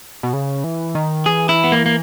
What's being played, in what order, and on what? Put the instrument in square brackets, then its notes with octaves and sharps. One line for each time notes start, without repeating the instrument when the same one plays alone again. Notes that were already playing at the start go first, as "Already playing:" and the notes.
[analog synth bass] B2
C#3
E3
D#3
[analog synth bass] E3 [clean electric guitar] G#4
[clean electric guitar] E4
B3
A#3
A#3